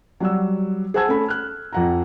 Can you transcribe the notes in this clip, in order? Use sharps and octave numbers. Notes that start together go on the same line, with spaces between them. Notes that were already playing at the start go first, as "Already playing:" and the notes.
F#3 G3 F#5 E6
G#4 C5 F#5 A5 E6 G#6
A3 C#4 A4 B5
F6 F#6
F2 F#5 A#5